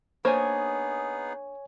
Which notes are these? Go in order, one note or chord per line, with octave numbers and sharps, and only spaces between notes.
A#3 B3 D4 D#4 G#4 C5 C#5 G#5